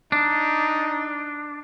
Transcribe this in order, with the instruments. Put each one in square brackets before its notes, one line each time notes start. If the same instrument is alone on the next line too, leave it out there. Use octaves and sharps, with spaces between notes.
[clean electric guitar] D4 [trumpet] D#4